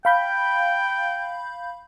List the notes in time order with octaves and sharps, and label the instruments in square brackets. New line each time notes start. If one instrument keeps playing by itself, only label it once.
[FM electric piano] F5 B5 G6 [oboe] G5